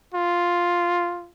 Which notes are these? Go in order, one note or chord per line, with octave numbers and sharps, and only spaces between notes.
F4